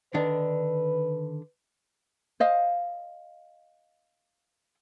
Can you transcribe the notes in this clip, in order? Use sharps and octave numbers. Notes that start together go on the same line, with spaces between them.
D3 D#3 D4 B4
C5 D#5 F5